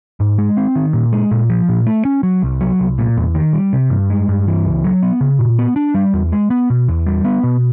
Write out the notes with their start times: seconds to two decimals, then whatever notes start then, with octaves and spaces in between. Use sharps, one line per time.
0.20 G#2
0.38 G#3
0.57 C4
0.75 D#3
0.93 A#2
1.13 G#3
1.31 A#2
1.50 F3
1.69 A#2
1.87 A3
2.05 C#4
2.23 F#3
2.43 C2
2.61 F#3
2.80 C2
2.98 A#2
3.17 E2
3.35 D#3
3.53 G3
3.73 C3
3.90 G2
4.10 G#3
4.29 G2
4.47 E3
4.65 C#2
4.84 F#3
5.02 B3
5.21 C#3
5.39 A#2
5.59 B3
5.76 D4
5.95 G3
6.14 E2
6.32 G#3
6.50 B3
6.70 B2
6.88 E2
7.06 G3
7.25 B3
7.43 B2